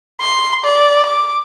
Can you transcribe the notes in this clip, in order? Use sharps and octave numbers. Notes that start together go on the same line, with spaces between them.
C6
D5
D6